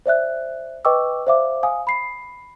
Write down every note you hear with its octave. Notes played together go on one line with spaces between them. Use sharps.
C5 D5 E5 F#6
B4 D#5 G5 C#6 D6 E6
C5 D5 E5 F5 D6
F5 G#5 D#6
B5 C7